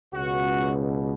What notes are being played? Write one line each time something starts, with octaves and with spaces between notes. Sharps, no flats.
C#2 B2 F#4